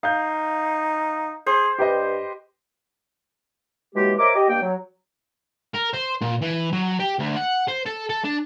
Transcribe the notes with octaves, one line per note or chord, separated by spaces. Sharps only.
D#4 F5 G6
G#4 C5
G2 G4 B4 D#5
E3 F#3 G#3 A#3 F#4 G4
A#4 C5 C#5 D#5 E5 D6
G4 D#5
G2 A#3 G5
F#3
A#4
C5
A#2
E3
F#3
G4
D2
F#5
C5
A4
A4
D4